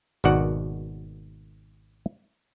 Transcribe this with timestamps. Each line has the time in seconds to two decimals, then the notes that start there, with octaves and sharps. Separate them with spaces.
0.24 G#1 B2 D#3 F#4 D5 F#5